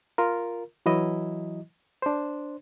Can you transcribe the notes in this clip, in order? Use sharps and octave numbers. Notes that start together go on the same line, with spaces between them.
F4 A#4
E3 F#3 E4 D#5
D4 C5